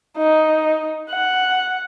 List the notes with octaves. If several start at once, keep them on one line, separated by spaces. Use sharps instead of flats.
D#4
F#5